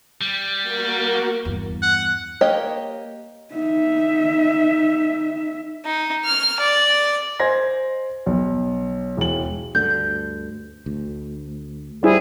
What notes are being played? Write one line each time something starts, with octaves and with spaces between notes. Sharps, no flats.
G3
A#3 F#4 A#4
E2 G2
F#5
A#3 G4 C#5 D#5
D#4 E5
D#4
F6
D5
C5 D#5 G#5 C6 G#6 A#6
B1
E1 F#7
D2 G2 D3 G6
D2
G3 E4 G#4 C5